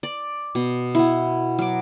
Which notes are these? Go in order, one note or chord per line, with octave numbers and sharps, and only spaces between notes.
D5
B2
B3 E4
F#3 D6